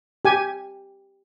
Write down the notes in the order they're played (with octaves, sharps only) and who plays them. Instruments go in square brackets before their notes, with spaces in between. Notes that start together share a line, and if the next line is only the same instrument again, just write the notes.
[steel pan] G4 G#5